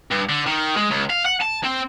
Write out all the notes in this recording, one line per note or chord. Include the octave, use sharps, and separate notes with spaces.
G2
D3
D#3
G#3
C#2
F5
F#5
A5
C4